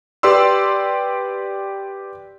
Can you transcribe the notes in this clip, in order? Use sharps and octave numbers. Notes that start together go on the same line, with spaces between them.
G4 B4 D5 C6 E6